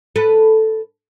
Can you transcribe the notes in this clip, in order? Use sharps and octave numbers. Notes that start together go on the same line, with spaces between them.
A4 B4